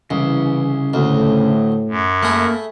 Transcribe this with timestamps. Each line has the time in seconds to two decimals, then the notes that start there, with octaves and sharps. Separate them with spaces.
0.10 C2 C#3 E3
0.94 D2 A2
1.89 F#2
2.23 A3 A#3 G#4 B5